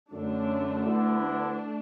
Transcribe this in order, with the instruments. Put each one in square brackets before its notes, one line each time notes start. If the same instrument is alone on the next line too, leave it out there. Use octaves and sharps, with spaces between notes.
[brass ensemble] F#2 D3 F#3 [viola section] A3 D4
[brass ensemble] D2 D3 B3 E4
[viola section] A3 D4